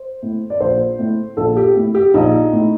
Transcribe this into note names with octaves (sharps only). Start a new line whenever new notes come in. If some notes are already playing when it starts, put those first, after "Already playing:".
Already playing: C5
A2
D5
A#1 C5
A2
A#1 A4
G4
A2
G4
A#1 D#4
A2